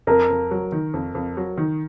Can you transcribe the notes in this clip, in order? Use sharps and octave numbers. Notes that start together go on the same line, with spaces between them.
F2 A#4
F2
F#3
D#3
F2
F2
F#3
D#3